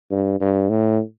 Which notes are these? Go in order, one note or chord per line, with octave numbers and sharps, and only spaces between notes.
G2
G2
A2